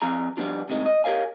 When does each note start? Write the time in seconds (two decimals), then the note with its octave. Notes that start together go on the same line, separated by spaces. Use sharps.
0.02 F3 C4 G#4 A#5
0.37 F3 G3 G#3 B3 D4 F4
0.69 A2 C3 D#3 G#3
0.86 D#5
1.04 G4 A#4 C#5 F5 G#5